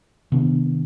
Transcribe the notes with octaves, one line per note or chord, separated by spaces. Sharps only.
C3 D#3 B3 D4